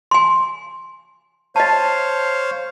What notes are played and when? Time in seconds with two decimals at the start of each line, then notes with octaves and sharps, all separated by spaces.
0.11 G#5 C6
1.56 C5 C#5 D#5 F5 A5